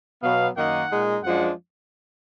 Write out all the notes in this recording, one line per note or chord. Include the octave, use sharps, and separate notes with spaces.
B2 F#3 B3 F5
F#2 D#3 A#3 D#4 F#5
A#2 G#3 D#4
F#2 F3 G#3 D4 F#5